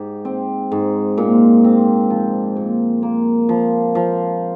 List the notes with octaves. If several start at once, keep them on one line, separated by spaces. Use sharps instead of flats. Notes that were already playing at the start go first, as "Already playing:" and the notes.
Already playing: G#2 G4
C4
G#2
A#2
C4
F3
A#2
A#3
F3
F3